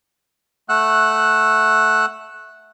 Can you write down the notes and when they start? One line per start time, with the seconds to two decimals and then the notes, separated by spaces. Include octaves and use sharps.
0.69 A3 F#5 E6 F#6